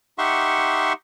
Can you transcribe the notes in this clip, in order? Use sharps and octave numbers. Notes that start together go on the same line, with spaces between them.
D#4 G4 E5 F#5 C6 C#6